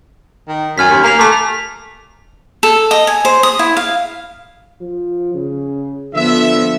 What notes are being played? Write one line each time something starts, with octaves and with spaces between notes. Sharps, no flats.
D#3
F#2 G#5 F6 B6
D#2
A#3 A#5 B6 F7
A3 D6 B6
A4
D#5
G#5
C5
D#6
E4
F5
F3
C#3
D3 F3 B3 E5